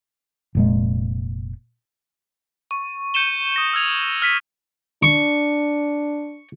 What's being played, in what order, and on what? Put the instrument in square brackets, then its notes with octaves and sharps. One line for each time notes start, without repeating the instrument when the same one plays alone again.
[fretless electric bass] F1 A#2 G#3
[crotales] C#6
G6 C#7 D#7 E7 G7
D#6 A#6
E6 F6 G#6 F7
F6 B6 D#7 F7
[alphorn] D4 [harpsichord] C#6